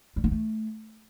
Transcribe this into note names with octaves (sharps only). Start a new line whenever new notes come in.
G3
A#3
A3